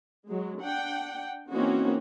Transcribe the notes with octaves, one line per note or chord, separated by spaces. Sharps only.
F#3 G#3
D4 F#5 G5
E3 A#3 C4 C#4 D#4 F#4